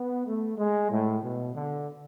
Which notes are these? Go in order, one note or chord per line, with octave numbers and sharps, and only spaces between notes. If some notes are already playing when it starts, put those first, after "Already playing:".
Already playing: B3
A3
G#3
A2
B2
D3